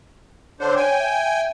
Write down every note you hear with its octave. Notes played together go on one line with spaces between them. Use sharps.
D3 D4 C5 C#5
G5 G#5
E5